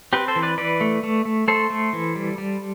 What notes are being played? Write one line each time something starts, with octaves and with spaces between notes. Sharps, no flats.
C4 G4 B4
A4 C5
E3
B4 D5
E3 B4 D5
A3
A3
A3
A3 A4 C5
A3
E3
G3
G3